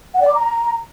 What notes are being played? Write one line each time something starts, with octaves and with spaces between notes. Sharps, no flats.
F#5
D5
D6
A#5